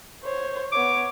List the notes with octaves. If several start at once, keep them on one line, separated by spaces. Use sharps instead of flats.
C5 C#5
B3 C#5 D6